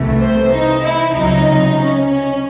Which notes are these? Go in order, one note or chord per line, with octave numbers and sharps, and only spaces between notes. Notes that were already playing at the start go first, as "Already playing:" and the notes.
Already playing: C2 C3 E3 A3
C5
D#4
E4
C#2 C3 F#3 D#4
C#4
C#4